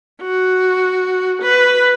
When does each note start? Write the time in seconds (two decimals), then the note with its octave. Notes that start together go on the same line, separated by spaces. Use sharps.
0.22 F#4
1.43 B4